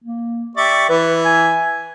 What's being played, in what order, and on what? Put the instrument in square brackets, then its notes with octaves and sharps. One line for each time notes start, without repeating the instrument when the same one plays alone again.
[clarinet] A#3
[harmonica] G4 D5 E5 [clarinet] C#6
[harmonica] E3 E5 [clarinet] B4
[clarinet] G#5